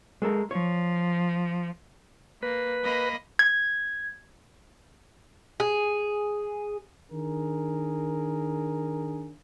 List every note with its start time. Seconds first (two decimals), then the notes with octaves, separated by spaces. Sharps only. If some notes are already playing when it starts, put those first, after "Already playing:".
0.22 G#3 A4 A#4
0.51 F3 C#5
2.43 A#3 B4
2.82 A#3 D#5 B5
3.39 G#6
5.60 G#4
7.11 D#3 D4 G#4 A#4